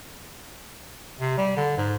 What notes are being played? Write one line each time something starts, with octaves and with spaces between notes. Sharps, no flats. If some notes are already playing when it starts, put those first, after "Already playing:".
C3
G3
D3
G#2